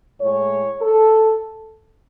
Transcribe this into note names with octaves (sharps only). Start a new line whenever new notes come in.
A2 G#3 C#5
A4